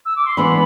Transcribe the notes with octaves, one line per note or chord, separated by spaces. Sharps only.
E6
D6
C6
E3 G#3 B3 D4 B5